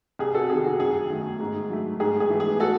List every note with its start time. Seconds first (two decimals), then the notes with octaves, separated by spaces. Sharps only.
0.19 C2 G#4
0.35 F#4 A4
0.50 C3 D#3 G#4
0.64 F#4
0.80 F#2 G#4
1.10 D#3 A3
1.40 G#2
1.70 F#3 A3
2.00 G#2 G#4
2.20 G#4
2.30 E3 A3
2.40 G#4
2.60 F#4 A4